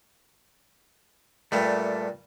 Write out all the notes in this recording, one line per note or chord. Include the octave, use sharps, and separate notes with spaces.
G2 A#2 G3 A3